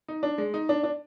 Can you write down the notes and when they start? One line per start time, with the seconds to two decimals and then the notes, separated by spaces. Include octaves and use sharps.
0.08 D#4
0.23 D4
0.38 G#3
0.54 D#4
0.69 D4
0.83 D4